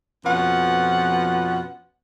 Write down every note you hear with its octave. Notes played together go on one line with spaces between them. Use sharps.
F2 B2 F3 C#4 B4 F#5